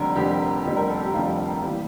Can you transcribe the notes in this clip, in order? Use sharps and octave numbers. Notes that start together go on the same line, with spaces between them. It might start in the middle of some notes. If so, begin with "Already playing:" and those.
Already playing: F1 F2 D3 G3 A#4
F1 F2 D3 G3 G4
F1 F2 D3 G3
A#4
A4
G4
F1 F2 D3 G3 F4
E3 G3 A#3